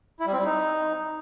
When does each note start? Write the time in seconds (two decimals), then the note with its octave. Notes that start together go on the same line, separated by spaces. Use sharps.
0.20 E4
0.26 G3
0.32 C4
0.39 G3
0.45 D#4